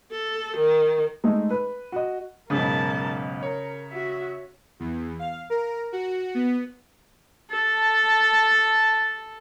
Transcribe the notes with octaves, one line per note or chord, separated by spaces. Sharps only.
A4
D#3
G#3 A3 D#4
B4
F#4 D#5
B1 G#2 C#3 A#4 A5
A#4 C#5
F#4 E5
E2
F5
A#4
F#4
B3
A4 A5